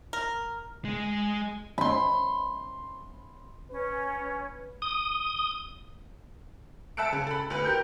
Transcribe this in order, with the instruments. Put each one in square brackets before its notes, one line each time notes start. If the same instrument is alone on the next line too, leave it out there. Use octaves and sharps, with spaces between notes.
[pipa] A#4
[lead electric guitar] G#3 G#4
[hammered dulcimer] B5 C6
[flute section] C#4 [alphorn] B4
[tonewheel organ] D#6
[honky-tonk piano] E5 A5 E6 F#6 C#7 D7
C#3
A4 B5
D2 B4 F#6
G4 A#4 G6